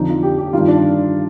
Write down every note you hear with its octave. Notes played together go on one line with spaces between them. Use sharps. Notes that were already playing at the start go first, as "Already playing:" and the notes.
Already playing: F2 D3 D#4
F4
G4
G4
G2 D#3 F4
D4